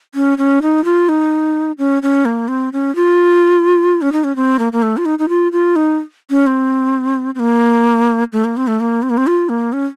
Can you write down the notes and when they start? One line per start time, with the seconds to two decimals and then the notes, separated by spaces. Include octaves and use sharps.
0.15 C#4
0.38 C#4
0.62 D#4
0.85 F4
1.09 D#4
1.78 C#4
2.03 C#4
2.25 A#3
2.48 C4
2.73 C#4
2.96 F4
4.02 C#4
4.12 D#4
4.24 C#4
4.36 C4
4.59 A#3
4.73 A#3
4.82 A3
4.97 F4
5.05 D#4
5.19 D#4
5.29 F4
5.52 F4
5.76 D#4
6.30 C#4
6.47 C4
7.35 C4
7.40 A#3
8.33 A3
8.45 A#3
8.57 C4
8.67 A3
8.80 A#3
9.03 C4
9.10 A#3
9.18 C4
9.27 F4
9.49 A#3
9.73 C#4